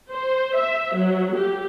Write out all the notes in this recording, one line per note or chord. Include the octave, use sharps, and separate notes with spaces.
C5
E5
F#3
G4